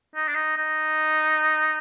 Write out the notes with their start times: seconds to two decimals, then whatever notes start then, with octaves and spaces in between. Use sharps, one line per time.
0.15 D#4
0.28 D4
0.35 D#4
0.57 D#4